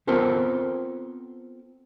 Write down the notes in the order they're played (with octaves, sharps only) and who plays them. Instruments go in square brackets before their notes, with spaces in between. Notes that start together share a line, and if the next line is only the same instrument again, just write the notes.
[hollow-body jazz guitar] B3 C4 F4 A4 A#4 C5